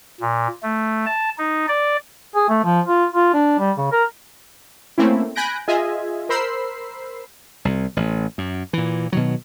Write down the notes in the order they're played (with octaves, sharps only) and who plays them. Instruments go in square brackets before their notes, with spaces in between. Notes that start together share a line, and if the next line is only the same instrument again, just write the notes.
[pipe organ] A#2
A3
A5
D#4
D5
[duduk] G#4
A3
F3
F4
F4
D4
G3
C#3
A#4
[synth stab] A3 A#3 C4 C#4 E4
G#5 B5 F#6 G6 A#6 D7
F4 G#4 D#5 E5 G#5
A#4 C5 B5 E6 C7
[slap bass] C2
A1
F#2
A#2 E3
B2 D#3 F#3